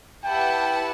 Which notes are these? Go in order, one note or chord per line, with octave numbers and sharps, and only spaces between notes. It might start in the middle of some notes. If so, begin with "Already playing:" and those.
E4 G4 B4 F#5 G5 A5